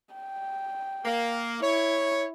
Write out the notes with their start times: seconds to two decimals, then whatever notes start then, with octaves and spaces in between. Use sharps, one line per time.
0.14 G5
1.04 A#3
1.62 E4 C#5